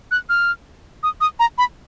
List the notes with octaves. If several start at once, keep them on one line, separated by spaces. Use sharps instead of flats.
F#6
F6
D#6
D#6
A#5
B5